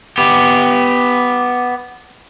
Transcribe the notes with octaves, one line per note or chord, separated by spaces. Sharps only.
B3 G4